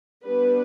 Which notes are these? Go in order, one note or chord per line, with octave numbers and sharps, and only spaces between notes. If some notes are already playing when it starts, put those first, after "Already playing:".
G3 B3 D4 B4